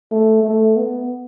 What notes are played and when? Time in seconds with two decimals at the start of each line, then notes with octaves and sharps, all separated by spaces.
0.11 A3
0.43 A3
0.76 B3